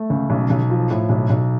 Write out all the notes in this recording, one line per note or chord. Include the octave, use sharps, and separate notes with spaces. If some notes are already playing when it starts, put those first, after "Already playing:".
Already playing: A3
C#2
B1
B1
F3
A2
B1
B1